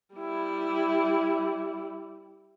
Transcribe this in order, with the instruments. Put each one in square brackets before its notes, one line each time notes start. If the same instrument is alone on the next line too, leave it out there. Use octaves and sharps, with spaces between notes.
[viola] G3 E4